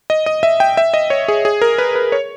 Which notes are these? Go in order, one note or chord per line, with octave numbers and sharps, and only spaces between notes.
D#5
D#5
E5
G5
E5
D#5
C#5
G#4
G#4
A#4
B4
B4
C#5